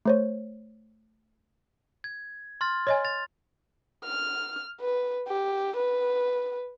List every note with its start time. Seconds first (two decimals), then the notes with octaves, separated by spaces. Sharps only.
0.05 A3 C5 C#5
2.04 G#6
2.61 C6 F6 A6
2.87 C#5 D#5 G#5
3.05 A6 F7
4.05 F6
4.81 B4
5.28 G4
5.77 B4